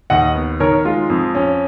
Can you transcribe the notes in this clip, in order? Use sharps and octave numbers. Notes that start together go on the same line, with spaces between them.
D#2 D#5 F#5
B3
D#3 A#4 C#5
G#3 F4
F2
C#4